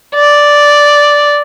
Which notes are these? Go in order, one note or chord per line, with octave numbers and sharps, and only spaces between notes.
D5